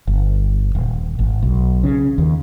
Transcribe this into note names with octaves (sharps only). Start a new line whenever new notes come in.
G1
D#1
G#1
B1
C#3
D#2